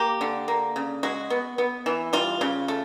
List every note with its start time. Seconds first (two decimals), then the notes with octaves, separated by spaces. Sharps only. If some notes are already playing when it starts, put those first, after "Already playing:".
Already playing: A#3 G4
0.21 D3
0.48 A#3
0.76 C#3
1.03 G#3 F#4
1.30 B3
1.58 B3
1.86 E3
2.13 G3 F4
2.41 C#3
2.68 A3